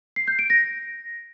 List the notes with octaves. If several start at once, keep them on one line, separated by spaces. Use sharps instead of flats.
C7
G6
D7
A#6